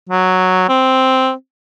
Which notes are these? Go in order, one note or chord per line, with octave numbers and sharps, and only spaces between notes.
F#3
C4